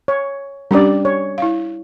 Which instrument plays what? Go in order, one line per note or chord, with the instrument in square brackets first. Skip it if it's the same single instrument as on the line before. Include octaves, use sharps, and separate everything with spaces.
[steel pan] C#5
[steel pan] G3 D5 [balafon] C#4 D4 G4
[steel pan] C#5
[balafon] E4 F5